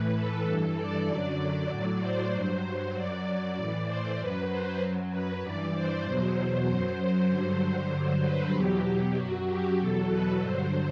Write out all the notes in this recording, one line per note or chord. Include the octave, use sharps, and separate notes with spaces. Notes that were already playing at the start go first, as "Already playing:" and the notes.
Already playing: A2 E3 B4
A4
G2 E3
D5
F#2 D3 F#3
A2 F#3 D5
C5
G2 F#3
F#2 F#3 D5
A2 E3
C5
F#2 F#3 B4
C5
F#2 F#3
B4
G2 E3 D5
C5
E2 B2 F#3 C5
C5
F#2 F#3 C5
G2 D3 F#3
G2 D3 F#3 C5
B4
E2 B2 F#3 G4
G4
F#2 F#3 F#4
G4
E2 B2 F#3 A4
B4
G2 D3 F#3 C5